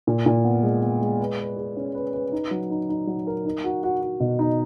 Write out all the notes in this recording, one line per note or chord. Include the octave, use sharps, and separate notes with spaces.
A#2
A#2
B3
G#3
B3
G#3
B4
B4
G#4
C#4
B4
B4
D#4
F#3
D#4
D#4
F#3
A#4
D#4
F#4
F#4
F#4
B2
D#4